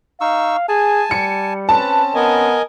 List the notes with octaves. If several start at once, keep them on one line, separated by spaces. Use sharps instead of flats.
D#4 F5 C#6 E6
G#4 G#5 A5
G3 C#7
C4 C#4 B4 A5
B3 A#4 D#5 G#5